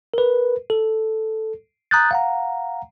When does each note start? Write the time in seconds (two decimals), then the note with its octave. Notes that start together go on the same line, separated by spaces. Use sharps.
0.14 A#4 B4
0.70 A4
1.91 A#5 D#6 F#6 G6 A6
2.11 F5 F#5 A#5